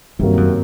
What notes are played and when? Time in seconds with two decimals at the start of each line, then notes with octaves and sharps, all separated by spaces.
0.19 G2 C3 D#3 F#3 A#3
0.37 F#2